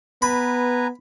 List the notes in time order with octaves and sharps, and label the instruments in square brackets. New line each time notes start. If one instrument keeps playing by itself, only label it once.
[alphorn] B3 [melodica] B4 G#5 A#5 [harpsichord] B5